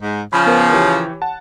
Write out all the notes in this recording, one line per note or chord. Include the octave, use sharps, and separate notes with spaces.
G#2
C#3 F3 B5 F6
B3 A#4 C5
E3 G4 C#5
F#5 A5